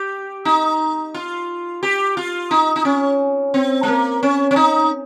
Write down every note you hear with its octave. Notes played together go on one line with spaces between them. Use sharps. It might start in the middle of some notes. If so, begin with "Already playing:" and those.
Already playing: G4
D#4
F4
G4
F4
D#4
D#4
C#4
C4
G#3
A#3
C#4
C#4
D#4